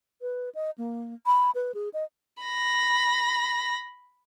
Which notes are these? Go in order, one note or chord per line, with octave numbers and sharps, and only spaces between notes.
B4
D#5
A#3
B5
B4
G#4
D#5
B5 A#6